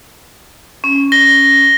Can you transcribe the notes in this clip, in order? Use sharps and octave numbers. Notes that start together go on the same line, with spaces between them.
C#4
A#6 G7